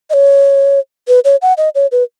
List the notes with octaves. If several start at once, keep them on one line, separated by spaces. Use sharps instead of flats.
D#5
C#5
B4
C#5
F#5
D#5
C#5
B4